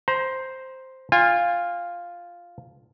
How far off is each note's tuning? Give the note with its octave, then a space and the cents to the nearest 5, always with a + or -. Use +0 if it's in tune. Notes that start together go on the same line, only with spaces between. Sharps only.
C5 +0 A#5 +35
F4 +0 G#5 -35